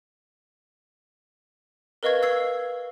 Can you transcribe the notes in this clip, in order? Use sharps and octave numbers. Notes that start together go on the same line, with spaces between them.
A#4 B4 D#5 F5 C#6 G#6
E6 G#6 C7